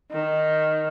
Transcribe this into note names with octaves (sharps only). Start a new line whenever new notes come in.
D#3